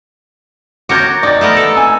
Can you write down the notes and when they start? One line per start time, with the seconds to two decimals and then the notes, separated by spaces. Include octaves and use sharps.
0.89 F#4 A#4 C#5 D6 G6 A6
1.23 D#4 D5 A6
1.41 A3 B3 A#4
1.57 A4
1.75 G#5 E6